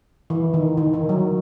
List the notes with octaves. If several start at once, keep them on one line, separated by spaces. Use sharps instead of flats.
E3
D#3
D#3
D#3
F#3